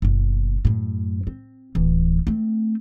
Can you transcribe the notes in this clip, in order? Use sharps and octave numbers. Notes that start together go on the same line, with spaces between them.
F#1 B2
F#2 A2
C4
D1 E3
A3 C4